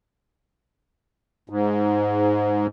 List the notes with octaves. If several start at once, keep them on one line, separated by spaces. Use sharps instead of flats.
G#2